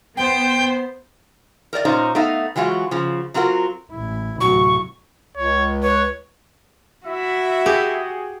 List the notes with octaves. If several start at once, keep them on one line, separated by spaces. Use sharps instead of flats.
B3 C5 G5
A#4 C5 D5 D#5
A#2 C#4 D#4 C5 A#5
A3 B3 D#4 A4 F5
E3 F#3 G#3 F4 F#4
C#3 F3
F#3 C4 F4 F#4 A#4
A1 E4
D1 A2 C3 F#3 C#6
C#2 C#5
B4 C#5
E4 F#4 E5
G4 G#4